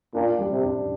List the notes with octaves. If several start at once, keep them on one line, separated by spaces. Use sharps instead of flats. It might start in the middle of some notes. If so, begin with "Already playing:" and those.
A#2 D4
G3
C3
D4